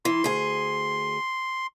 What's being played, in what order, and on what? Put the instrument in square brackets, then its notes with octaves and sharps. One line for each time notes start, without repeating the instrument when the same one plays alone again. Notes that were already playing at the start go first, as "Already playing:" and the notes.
[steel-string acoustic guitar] E3 [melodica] C6
[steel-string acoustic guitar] D2 G#4